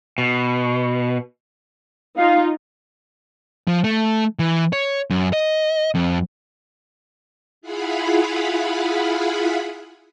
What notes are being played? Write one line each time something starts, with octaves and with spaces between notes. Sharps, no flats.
B2
D#4 F4 F5
F3
A3
E3
C#5
F#2
D#5
F2
E4 F4 G#4 F5 F#5 B5